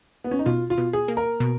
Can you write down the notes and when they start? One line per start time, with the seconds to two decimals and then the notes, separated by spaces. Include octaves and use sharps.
0.24 B3
0.31 C#4
0.39 D#4
0.46 B2 F4
0.70 F4
0.78 B2
0.93 G#4
1.08 A#3
1.17 A#4
1.40 B2